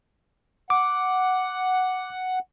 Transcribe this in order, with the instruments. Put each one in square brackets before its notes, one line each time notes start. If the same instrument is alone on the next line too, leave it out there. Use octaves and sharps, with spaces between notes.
[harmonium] F#5 [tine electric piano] D6